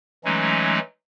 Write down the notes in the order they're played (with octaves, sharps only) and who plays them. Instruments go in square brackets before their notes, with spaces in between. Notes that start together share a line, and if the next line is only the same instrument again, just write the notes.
[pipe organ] E3 F#3 G#3 A3 C#4 D#4